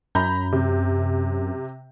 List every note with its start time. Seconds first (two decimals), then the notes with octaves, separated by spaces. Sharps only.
0.15 F#2 A#5 B5 G6
0.52 C3